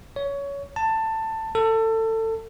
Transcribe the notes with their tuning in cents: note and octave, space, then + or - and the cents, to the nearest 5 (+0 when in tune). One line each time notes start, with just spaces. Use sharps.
C#5 +20
A5 +15
A4 +25